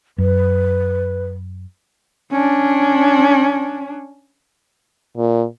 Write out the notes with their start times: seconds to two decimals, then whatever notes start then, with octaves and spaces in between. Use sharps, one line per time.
0.18 F#2 B4
2.31 C#4 D4
5.17 A#2